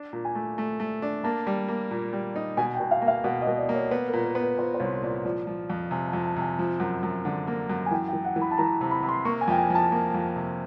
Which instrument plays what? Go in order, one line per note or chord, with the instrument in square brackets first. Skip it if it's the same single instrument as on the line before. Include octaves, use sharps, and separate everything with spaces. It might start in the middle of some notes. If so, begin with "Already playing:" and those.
Already playing: [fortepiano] D4
A#2
[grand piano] G#5
[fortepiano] A3
A3
A3
D4
[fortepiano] A#3 [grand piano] A5
[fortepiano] G3
A#3
A#2
G3
D#4
[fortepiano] B2 [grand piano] G#5
[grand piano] G5
[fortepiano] B2
[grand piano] F5
[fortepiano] A#3
[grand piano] F5
[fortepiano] B2 [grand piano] F#5
[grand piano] D#5
[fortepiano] B2
[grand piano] D5
[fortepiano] A#3
[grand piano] C#5
[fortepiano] B3
[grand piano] A#4
[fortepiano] A#2
[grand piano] A#4
[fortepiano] B3
[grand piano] B4
[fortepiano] A#2 [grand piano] C5
[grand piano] C5
[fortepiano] C2 [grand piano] C#5
[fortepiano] A#2 [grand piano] D5
[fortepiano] F3 [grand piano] D5
[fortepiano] F3
F2
[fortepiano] C3 [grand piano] G#5
[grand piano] A5
[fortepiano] F2
[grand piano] A5
[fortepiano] C3 [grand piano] G#5
[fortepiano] F3
F#2
F#2
D3
A#3
F#2
[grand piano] G#5
[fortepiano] E3 [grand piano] G5
[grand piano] G5
[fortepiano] E3
[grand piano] F#5
[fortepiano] E3
[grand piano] B5
A5
[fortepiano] E3 [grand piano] A#5
[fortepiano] C3
[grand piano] B5
[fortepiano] C3
[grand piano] C6
[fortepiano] A#3 [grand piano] C#6
[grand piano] G#5
[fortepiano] F2 [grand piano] G5
[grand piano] G#5
[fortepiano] F3
[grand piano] A5
[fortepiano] A#3
F2
C3